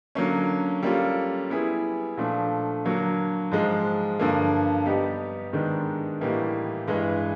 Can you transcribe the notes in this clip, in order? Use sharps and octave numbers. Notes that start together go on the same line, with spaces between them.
D3 F#3 A#3 C#4
G3 A#3 C#4 F4 A4
G3 B3 E4 G#4
A#2 F3 A3 D4
D3 F#3 A#3
G#2 F3 G#3
G2 D3 F3 A#3
G3 B3 D#4 G4
G#2 D#3 G#3 B3 D4
A2 E3 G3 A#3 D#4
G2 E3 G#3